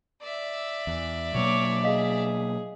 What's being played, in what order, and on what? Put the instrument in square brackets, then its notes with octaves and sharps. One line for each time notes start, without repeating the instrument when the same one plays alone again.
[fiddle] D5 E5
[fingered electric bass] E2
[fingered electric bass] B2 F#3 A#3 [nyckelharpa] C#5 D6
[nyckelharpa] G#4 [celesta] D#5 F5 B6